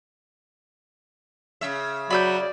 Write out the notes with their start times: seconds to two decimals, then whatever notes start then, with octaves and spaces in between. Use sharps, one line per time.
1.61 C#3 E5
2.10 F#3 D5 B5 E6 G6